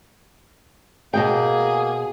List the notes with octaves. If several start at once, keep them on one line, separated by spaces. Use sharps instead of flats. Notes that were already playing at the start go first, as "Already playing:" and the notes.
B2 A#3 F#4 G#4 G5